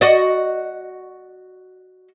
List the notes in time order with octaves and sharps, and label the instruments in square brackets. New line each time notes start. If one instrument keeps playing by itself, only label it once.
[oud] F#4 D5 D#5